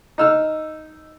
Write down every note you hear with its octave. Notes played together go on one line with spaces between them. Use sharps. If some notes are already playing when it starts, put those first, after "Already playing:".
D#4 E6 F6